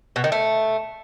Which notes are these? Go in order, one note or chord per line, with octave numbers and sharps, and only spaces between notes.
B2
D#3
A3